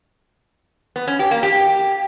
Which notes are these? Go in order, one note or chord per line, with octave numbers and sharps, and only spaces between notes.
B3
C#4
G4
A#3
G4